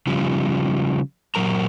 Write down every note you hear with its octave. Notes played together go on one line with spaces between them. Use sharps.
C#3 F3 G3
A#2 F#3 A#4 A#5